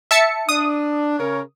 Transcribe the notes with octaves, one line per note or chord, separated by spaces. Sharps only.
E5 A5 C#7
D4 D#6
C#3 A#4 C#5